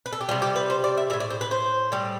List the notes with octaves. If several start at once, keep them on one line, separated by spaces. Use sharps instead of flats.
B4
A4
G4
C3 G3 F4
G4
B4
C5
D5
E5
G3 E5
A2
D5
C5
B4
C5
A2 G3